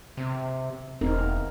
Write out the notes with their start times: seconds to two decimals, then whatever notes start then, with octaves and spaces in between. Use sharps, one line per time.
0.17 C3
1.01 E1 C4 D#4 A#4